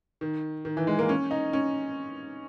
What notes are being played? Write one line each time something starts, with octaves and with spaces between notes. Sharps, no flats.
D#3
D#3
E3
G#3
A#3
C#4
D#4
C#4